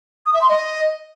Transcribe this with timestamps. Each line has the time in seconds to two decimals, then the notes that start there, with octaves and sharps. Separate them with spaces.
0.26 D#6
0.34 E5
0.41 C6
0.49 D#5